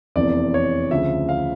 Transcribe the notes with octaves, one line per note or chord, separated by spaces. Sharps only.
F1 E2 E3 D5
C#5
D2 C#3 F3 E5
F5